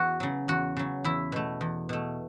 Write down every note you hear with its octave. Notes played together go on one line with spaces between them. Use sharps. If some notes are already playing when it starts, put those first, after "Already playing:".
Already playing: E2 F#4
C#3 F#3
E2 F#4
C#3 F#3
E2 E4
B2 A3
E2
B2 A3